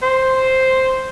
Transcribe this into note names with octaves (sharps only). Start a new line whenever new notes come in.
C5